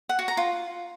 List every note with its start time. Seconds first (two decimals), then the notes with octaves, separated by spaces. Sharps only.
0.09 F#5
0.19 F#4
0.28 A#5
0.37 F4